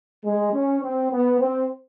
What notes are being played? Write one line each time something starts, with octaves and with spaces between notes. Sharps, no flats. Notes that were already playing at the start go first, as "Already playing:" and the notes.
G#3
C#4
C4
B3
C4